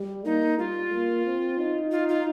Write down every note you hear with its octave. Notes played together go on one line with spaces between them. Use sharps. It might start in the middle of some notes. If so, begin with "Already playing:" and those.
Already playing: G3
A#3 D#4
G3 F4
A#3
C4
D#4
F4
F4